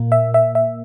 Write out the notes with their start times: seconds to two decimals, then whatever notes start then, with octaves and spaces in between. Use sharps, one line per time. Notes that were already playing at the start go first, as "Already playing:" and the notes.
Already playing: A#2 A#3
0.12 E5
0.34 E5
0.55 E5